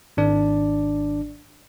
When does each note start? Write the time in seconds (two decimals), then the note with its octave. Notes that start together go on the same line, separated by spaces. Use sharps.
0.17 G#1 D4 D5